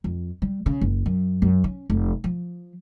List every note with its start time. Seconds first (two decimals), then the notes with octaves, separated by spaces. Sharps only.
0.04 F2
0.42 G3
0.66 C#3
0.81 F#1
1.06 F#2
1.42 F#2
1.64 C#4
1.90 F1
2.24 F3